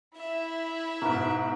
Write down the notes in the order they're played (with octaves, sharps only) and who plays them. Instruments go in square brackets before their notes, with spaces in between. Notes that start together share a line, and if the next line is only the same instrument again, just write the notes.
[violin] E4 [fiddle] E5
[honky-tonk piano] G#2 B2 [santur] A#4